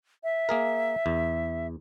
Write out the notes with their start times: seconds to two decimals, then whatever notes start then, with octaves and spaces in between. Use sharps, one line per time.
0.24 E5
0.49 A#3 G#4 A#4
1.06 E2